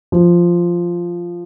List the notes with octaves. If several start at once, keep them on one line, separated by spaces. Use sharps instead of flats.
F3